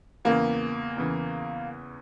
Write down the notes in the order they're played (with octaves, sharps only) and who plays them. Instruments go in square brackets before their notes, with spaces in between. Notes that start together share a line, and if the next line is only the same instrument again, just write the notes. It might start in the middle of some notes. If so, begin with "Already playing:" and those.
[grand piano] E2 C#3 E3 [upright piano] A#3
[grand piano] E2 C#3 E3